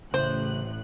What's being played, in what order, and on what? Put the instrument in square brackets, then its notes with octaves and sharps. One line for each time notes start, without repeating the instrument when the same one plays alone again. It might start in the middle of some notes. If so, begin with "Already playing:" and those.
[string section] A1 A2 F#6 [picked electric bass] C#3 [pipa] C5